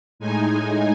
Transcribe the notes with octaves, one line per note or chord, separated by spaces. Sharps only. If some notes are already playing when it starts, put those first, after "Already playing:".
A2 G#3 D#4 G#5